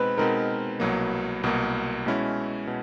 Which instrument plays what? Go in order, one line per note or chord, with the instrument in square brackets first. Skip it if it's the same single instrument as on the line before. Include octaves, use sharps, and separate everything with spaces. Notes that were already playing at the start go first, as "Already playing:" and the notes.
Already playing: [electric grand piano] B2 G#3 C4 D#4 [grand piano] B4
[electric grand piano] B2 G#3 C4 D#4 [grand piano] A#4
[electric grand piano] C2 B2 F#3 A#3
C2 B2 F#3 A#3
B2 G#3 C#4 E4
B2